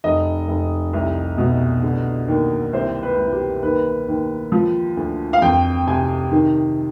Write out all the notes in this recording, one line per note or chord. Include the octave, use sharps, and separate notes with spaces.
F1 D#5
F1
C2
B2
D3
D#2
C2 C5
B4
C2
G4
D#2 B4
D#2
F3
D2
F5
F2 G5
C3 G#5
D#3